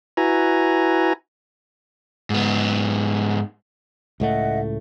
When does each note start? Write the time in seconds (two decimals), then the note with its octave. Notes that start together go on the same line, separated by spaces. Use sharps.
0.17 E4 F#4 B4 G#5 A#5
2.30 G#2 B3
4.20 C#2 A2 A3 D#5 E5 F#5